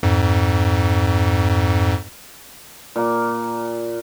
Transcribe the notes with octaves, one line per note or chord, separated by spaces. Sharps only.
F2 G#2
A#2 A#3